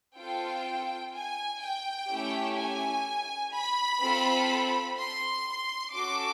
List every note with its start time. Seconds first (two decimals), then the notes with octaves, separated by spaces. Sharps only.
0.16 C4 F4 A4 G5
1.13 G#5
1.61 G5
2.08 A3 C#4 E4 G4
2.57 G#5
3.53 B5
4.02 C4 F4 A4
4.97 C6
5.94 C#4 F#4 A4 D6